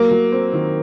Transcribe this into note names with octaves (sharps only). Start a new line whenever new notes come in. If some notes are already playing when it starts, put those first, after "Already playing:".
Already playing: F#3 A#3
F#3
C4
D#3